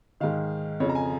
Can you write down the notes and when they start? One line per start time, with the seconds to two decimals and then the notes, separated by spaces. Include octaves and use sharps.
0.20 G#2 D#3 F5
0.80 F2 C#3 F3 C#5
0.89 A#5
0.95 G#5